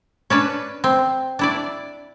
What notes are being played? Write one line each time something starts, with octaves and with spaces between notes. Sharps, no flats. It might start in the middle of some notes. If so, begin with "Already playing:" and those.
C#4 D4 B4
C4
D4 E4 D5